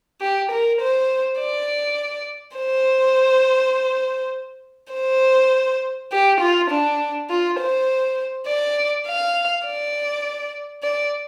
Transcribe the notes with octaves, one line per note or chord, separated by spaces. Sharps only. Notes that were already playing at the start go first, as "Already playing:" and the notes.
G4
A#4
C5
D5
C5
C5
G4
F4
D4
F4
C5
D5
F5
D5
D5